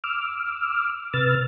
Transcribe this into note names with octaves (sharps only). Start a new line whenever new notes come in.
D6 E6 F6
C3 B4 E6 F6 A6